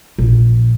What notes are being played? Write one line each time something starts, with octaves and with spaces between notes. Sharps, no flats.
A#1